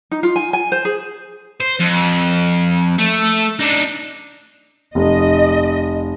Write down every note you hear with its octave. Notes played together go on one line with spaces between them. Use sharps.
D#4
F4
G#5
G#5
C5
G#4
C5
F2
A3
D4 D#4
F1 D#5